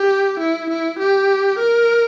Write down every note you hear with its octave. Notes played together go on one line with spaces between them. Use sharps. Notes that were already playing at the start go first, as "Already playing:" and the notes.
Already playing: G4
E4
E4
G4
A#4